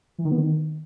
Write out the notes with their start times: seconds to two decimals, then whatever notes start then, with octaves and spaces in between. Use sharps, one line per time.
0.18 E3
0.25 D#3
0.32 B3
0.38 D#3